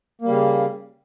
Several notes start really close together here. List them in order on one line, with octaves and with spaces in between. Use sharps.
A#3 G3 C#3